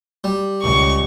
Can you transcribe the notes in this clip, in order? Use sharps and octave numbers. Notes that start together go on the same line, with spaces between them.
G3
C#2 C#6